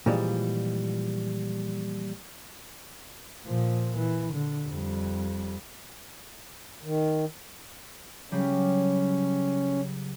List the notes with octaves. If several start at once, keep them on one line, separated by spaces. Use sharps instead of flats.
A#2 E3 F3 G3 G#3
A#2 F3
E3
D3
F2 G3
D#3
C#3 F#3 G3 C#4